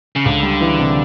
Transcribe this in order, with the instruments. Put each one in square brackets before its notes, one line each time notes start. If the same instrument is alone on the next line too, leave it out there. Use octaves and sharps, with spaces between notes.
[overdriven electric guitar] C#3
[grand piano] C#2 [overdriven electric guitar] D3
[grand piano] G3
E3
C3